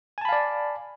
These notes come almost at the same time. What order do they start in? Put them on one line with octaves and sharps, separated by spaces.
G#5 A5 B5 F5 D5